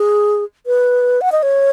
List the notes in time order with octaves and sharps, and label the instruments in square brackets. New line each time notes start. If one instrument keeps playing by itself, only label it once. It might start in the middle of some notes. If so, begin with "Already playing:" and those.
Already playing: [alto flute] G#4
B4
F#5
D#5
C#5